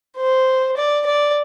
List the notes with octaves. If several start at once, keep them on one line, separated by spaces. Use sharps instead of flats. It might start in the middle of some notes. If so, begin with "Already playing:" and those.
C5
D5
D5